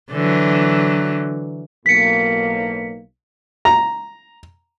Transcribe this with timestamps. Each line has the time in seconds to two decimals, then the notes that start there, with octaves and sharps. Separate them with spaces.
0.12 D3 E3 F#3
1.86 B1 A2 A#3 B6 C#7
3.65 A#5